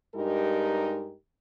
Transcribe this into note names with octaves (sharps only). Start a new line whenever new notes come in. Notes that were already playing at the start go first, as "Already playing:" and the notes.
G2 G#3 D#4 G4 A#4